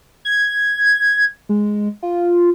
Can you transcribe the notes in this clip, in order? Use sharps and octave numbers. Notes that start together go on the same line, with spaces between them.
G#6
G#3
F4